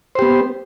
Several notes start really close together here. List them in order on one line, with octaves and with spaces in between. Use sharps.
C5 G4 B3